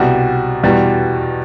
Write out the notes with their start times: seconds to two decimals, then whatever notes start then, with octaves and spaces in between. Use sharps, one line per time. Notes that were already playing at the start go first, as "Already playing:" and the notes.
Already playing: C2 B2 G3 F#4
0.63 E2 B2 G3 F#4